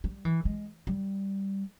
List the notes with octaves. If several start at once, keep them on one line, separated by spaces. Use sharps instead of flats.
G3
E3
G#3
G3